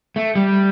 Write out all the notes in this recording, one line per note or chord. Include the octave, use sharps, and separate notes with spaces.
A3
G3